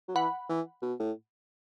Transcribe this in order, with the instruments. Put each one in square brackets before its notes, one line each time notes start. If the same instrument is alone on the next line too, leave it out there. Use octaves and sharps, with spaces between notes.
[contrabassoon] F#3
[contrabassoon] E3 [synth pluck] F#5 B5
[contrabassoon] E3
B2
A2